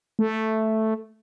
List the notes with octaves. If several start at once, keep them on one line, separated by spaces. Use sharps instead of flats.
A3